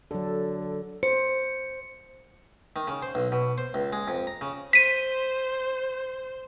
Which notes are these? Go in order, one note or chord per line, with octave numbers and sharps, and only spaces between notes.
D3 F#3 A4
C5 C#7
D#3
C#3
C5
B1
B2
C5
C#2
G#3
F2
A#5
C#3
C5 B6 D#7